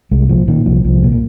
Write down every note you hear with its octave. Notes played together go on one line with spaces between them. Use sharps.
C2 G#3
A#2 F3
A#2 D#3
C2 F3
C2 F3
A#2
A#3